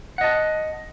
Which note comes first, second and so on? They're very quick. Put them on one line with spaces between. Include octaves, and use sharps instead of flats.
F#5 D#5 A5